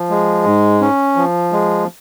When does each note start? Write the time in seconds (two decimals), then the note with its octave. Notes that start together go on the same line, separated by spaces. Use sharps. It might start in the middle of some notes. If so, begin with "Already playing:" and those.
Already playing: F3
0.10 G#3
0.45 G#2
0.81 C#4
1.16 F3
1.52 G#3